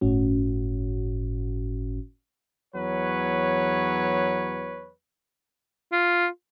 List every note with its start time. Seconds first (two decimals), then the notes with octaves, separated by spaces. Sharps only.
0.01 G1 A2 C#4 F#4
2.73 E2 F#3 B4 C#5
5.92 F4